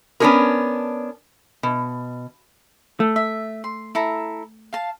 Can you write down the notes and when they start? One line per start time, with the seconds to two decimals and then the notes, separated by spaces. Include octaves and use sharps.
0.20 B3 C#4 D4 F#4 G#4 A#4
1.63 B2
3.00 A3
3.16 E5
3.64 C6
3.95 E4 A4 A#5
4.73 F5 A5